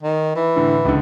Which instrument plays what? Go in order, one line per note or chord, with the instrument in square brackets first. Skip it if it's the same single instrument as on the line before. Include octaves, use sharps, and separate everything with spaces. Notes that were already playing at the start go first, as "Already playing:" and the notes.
[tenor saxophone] D#3
E3
[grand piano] A2 D3
C#2 D3